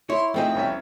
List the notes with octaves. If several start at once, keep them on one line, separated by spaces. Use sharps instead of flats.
E4 C#5 C6
F2 A3 C4 D#4 G#4 D#5 G5
C2 C#4 E5